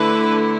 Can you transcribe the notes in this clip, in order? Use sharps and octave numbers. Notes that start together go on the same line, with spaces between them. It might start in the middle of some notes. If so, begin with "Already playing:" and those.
Already playing: D3 A3 E4 B4